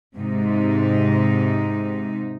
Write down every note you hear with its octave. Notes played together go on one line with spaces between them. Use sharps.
G#2 C3 D#4